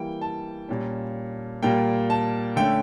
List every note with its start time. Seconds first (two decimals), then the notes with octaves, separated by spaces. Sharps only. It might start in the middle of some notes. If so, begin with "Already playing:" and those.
Already playing: E3 G3 A#3 G5
0.21 A5
0.69 A#2 G3 C#4
1.62 A#2 G3 A#3 G5
2.10 A5
2.56 D3 A3 C#4 G5